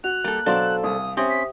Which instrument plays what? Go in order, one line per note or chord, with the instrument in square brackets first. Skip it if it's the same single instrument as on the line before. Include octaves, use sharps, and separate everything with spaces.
[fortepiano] F#4 [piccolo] F#6 [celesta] F7
[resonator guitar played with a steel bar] G3 A4 [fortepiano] A#3
[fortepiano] B2 F#3 D4 [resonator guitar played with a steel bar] A4 C5 D5 [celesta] F5
[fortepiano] C2 [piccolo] D#6
[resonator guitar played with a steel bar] C4 C#4 [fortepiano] G4 [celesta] C5 E5 D#6
[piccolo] B6